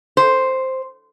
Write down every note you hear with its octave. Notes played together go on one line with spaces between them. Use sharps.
C5